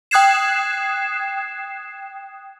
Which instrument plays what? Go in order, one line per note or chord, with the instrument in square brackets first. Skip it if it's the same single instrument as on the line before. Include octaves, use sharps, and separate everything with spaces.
[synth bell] G5 D#6 F#6 G#6 C7 E7